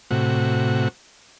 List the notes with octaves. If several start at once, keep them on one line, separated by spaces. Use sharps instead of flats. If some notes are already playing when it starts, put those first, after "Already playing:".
A2 C3 F#4